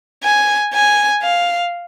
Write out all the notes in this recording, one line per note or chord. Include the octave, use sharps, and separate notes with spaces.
G#5
G#5
F5